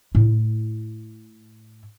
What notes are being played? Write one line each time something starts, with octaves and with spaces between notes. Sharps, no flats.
A2 E4